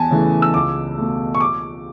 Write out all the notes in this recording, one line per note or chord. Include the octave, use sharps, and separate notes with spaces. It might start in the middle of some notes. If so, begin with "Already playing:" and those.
Already playing: E2 G#5 A5
C#3 E3 A3
E6
C#2 D6
B2 A3
C#6
D6